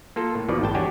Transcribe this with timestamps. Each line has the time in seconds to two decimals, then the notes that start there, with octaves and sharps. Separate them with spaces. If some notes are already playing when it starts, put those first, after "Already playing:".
0.16 A#3 F4 A4
0.35 A2
0.48 D#2 B2 D#3 F3 B4 D5
0.61 G#1 A2 G5 A5
0.75 E2 D4 F#4 G4 C#5 G#5